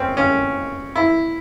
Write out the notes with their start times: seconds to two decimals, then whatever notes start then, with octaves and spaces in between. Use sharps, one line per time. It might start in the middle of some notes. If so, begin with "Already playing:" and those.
Already playing: C4 C#4
0.17 C#4
0.96 E4